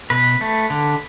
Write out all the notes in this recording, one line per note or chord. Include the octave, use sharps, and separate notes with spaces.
B2 B4
A3
D3